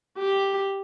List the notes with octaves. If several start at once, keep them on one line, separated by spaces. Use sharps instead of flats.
G4